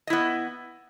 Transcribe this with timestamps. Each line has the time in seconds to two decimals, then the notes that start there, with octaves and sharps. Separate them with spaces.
0.07 D#5
0.10 E4
0.13 B3